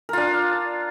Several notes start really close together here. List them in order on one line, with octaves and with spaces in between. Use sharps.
A#4 F4 D4